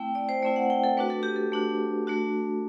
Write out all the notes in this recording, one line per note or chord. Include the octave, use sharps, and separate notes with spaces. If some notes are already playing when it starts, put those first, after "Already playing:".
Already playing: A3 C4 E4 G5
D5
C5
A3 C4 E4 D5
F#5
G5
A4
A3 D4 F#4 B4
A4
G4
A4
A3 D4 F#4
A3 D4 F#4